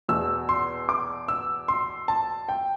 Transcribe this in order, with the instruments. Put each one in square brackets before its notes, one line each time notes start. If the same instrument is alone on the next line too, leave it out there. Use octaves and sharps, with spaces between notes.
[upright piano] E2 B2 E6
C6
D6
E6
C6
A5
G5